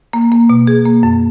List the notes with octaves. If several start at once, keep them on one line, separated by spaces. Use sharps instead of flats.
A#3
A#3
B2
G#4
A#3
F#2